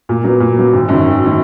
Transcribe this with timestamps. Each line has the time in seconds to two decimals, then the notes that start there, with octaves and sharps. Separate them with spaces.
0.09 A#2
0.24 F#3 B3
0.40 A#2
0.57 F#3 B3
0.73 G#1
0.89 F#2 D#3
1.06 G#1
1.26 D#3